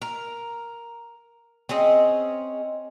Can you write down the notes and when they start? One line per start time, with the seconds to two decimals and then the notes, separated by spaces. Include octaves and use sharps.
0.02 A#4
1.69 C4 C#4 G#4 D#5